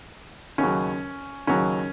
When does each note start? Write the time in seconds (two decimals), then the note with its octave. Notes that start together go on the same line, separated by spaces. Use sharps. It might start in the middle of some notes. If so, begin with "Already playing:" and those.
0.58 D#2 C#3 F#3 C#4
1.47 D#2 C#3 F#3 C#4